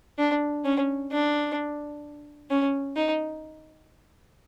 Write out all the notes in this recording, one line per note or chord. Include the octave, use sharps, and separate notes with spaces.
D4
C#4
D4
C#4
D#4